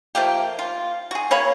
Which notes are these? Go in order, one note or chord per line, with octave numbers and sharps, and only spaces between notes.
F3 A3 A#3 G4
F4
F#4 G#4
A#3 C#5 B5